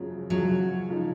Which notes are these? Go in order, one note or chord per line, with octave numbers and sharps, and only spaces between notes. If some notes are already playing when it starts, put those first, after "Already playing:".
Already playing: F#2 C#3 F3 G#3 C#4
F#2 C#3 F3 F#3 G#3 C#4
C#3 F3 G#3 D#4